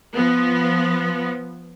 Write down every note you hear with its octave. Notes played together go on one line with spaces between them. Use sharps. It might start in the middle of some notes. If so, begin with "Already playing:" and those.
F3 B3